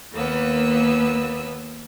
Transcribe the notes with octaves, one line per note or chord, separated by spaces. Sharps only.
D#2 A#3 B3 E6